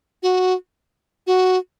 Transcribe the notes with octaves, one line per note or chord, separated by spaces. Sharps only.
F#4
F#4